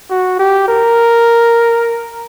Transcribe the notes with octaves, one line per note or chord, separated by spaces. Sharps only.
F#4
G4
A#4